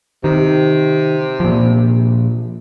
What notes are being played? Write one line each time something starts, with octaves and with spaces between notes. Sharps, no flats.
C3 D#3
A#2 F3